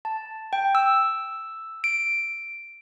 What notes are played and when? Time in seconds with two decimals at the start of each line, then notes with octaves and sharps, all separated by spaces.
0.05 A5
0.53 G5
0.75 E6
1.84 D7